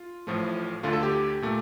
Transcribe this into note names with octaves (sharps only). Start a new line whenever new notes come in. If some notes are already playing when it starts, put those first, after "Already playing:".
Already playing: F4
A1 A2 F3 A3
D2 D3 A3 F4
A4
G4
A#2 A3